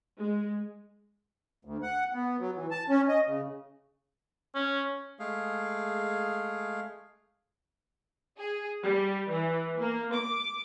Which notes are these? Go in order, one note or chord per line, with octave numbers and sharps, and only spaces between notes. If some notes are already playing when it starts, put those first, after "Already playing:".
G#3
D2
F#5
B3
F#3
E3
A5
C#4
D#5
C#3
C#4
G#3 A3 G#4 F5
G#4
G3
E3
A#3
D6